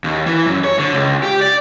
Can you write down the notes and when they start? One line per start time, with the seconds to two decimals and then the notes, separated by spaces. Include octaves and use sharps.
0.04 D#2
0.26 E3
0.46 F#2
0.64 C#5
0.79 D3
0.94 C#2
1.23 G4
1.41 D5